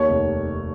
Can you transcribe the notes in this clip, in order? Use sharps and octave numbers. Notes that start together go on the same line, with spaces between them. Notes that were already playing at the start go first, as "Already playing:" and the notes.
Already playing: D#2 C#5
F1